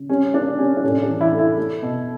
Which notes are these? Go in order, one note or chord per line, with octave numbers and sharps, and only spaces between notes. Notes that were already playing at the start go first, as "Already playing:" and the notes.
Already playing: C#3
G3 C#4
A#3 D4
G3 C#4
D4
A2 C#4
D4
E3
E4
A3
E4
A3
B2